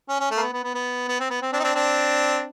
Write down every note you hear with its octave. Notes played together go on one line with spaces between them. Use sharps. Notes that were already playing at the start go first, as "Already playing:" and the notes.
C#4
C#4
A3
A#3
B3
B3
B3
B3
B3
C4
B3
C4
C4 D4
D#4
C4 D4
C4 D4